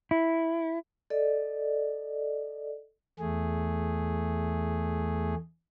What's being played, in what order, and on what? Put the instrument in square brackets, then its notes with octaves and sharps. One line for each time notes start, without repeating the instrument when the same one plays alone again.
[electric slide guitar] E4
[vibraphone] A4 D5 D#5
[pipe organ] E2 A3 G#4